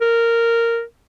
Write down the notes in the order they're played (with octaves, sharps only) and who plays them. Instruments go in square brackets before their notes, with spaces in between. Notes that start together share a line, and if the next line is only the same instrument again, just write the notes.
[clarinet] A#4